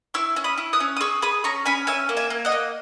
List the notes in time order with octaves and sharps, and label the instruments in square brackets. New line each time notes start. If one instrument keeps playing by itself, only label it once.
[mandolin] E4 C#6 E6
C#4
B5 D#6
E4
D#6 F#6
C#4
D#6
G#4 C#6 E6
G#4 B5 D#6
C#4 A#5 C#6
C#4 G#5 B5
C#4 E5 G#5
A#3
E5 G#5
A#3
D#5 F#5
A#3